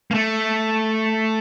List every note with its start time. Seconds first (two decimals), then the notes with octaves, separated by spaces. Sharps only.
0.11 A#3
0.14 A3